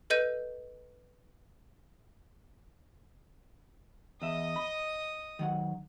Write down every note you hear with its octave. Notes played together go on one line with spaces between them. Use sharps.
A4 B4 D#5 G6 D#7
E2 D#5 E5 D#6
B5
D#3 F#3 F#5